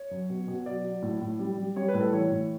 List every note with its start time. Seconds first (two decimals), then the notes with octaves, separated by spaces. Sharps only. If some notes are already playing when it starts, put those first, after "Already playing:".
Already playing: C#5
0.11 F#2
0.30 B2
0.48 B2
0.66 F#3 D5
0.84 F#3
1.02 A2
1.21 A2
1.39 G3
1.58 G3
1.76 G3 C#5
1.88 B4
1.94 A2
2.01 A4
2.13 E3 C#5
2.31 A2